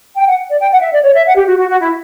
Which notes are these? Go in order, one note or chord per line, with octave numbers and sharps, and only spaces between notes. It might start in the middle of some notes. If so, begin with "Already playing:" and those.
G5
F#5
D5
G5
F#5
E5
D5
C#5
E5
F#5
G4
F#4
F#4
F#4
E4